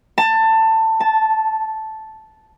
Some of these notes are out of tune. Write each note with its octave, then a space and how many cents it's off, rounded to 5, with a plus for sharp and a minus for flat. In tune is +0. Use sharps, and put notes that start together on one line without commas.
A5 +20
A5 -5